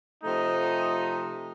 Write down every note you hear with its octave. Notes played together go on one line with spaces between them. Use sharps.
C3 F3 A3 D#4